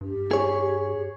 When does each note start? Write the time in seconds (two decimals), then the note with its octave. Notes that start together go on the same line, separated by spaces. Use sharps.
0.01 G2 G4
0.31 G#4 C#5